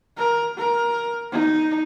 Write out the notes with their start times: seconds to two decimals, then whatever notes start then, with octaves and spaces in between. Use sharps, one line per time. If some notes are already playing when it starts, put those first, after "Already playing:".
0.17 A#4
0.57 A#4
1.31 D#4